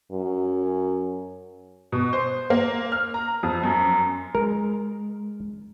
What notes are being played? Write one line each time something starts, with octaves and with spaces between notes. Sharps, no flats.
F#2
B2
C5
A#3
F6
A#5
F2
F#2
G#3 A#4